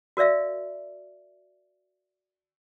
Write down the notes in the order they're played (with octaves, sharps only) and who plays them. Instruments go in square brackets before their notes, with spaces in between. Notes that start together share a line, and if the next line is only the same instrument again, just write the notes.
[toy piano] F#4 A#4 D5 E5 F5